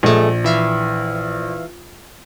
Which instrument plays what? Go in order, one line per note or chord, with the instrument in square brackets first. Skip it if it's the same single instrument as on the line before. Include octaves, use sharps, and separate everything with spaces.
[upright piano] A#1 [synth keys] G#3 A3
[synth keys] E3 E5 F5